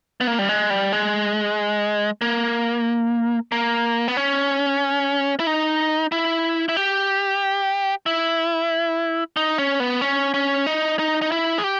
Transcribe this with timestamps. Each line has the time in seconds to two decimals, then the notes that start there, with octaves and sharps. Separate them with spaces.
0.21 B3
0.27 A#3
0.39 G3
0.49 G#3
0.70 G3
0.92 G#3
2.21 A#3
3.52 A#3
4.08 B3
4.17 C#4
5.39 E4
5.47 D#4
6.12 E4
6.69 E4
6.77 G4
8.06 E4
9.37 D#4
9.58 C#4
9.80 B3
10.01 C#4
10.34 C#4
10.66 D#4
10.99 D#4
11.22 D#4
11.32 E4
11.58 G#4
11.64 G4